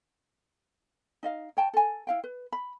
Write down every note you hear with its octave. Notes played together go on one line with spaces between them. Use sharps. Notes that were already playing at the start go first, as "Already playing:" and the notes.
D#4 D#5 F5
C#5 G5 A5
A4 G#5
E4 F5 G5
B4
B5